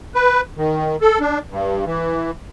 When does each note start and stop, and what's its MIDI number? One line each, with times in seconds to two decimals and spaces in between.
0.15 0.41 71
0.57 0.96 51
1.01 1.19 69
1.20 1.39 62
1.50 1.85 43
1.86 2.31 52